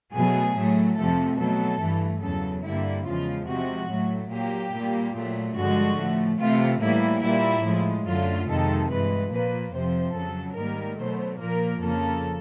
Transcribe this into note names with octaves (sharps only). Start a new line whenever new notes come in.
B2 F#3 A3 G#4
A2 F#3 A3
F2 C3 F3 A3 A4
B2 F#3 A3 A4
G2 E3 A3
E2 C#3 F#3 A4
G2 D3 G3 A#3 E4
E2 C#3 F3 G#3 F4
C3 F3 G#3 F#4
A2 F#3 A3
A#2 F#3 A#3 G4
A#2 G3 A#3
A#2 F#3 A3
G2 D3 F3 G#3 F#4
A2 F3 A3
C3 E3 A3 F4
A2 E3 G3 A#3 E4
A#2 G3 A#3 E4
A2 F3 G#3
F#2 D3 F#3 A3 F4
F2 C3 D#3 G#3 A4
G2 E3 G#3 B4
A#2 F3 A#3 B4
F2 C3 F3 C5
F2 C#3 F#3 A4
G#2 D#3 G3 A#3 A#4
B2 F#3 A3 C5
A#2 F3 A#3 A#4
F2 C#3 F3 A#3 A4